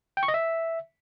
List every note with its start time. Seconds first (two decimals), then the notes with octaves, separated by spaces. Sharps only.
0.17 G5
0.23 C#6
0.28 D#5
0.34 E5